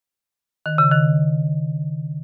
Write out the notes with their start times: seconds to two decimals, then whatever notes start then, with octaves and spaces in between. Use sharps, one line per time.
0.66 D#3
0.78 C#3
0.91 D#3